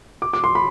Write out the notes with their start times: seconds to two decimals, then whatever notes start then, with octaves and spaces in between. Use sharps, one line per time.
0.22 D6
0.33 D6
0.44 C6
0.55 B5